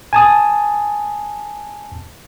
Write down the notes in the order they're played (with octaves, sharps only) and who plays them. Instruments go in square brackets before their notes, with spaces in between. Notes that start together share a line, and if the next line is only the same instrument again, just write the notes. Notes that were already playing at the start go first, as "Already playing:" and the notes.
[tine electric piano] G#5 A5 D#6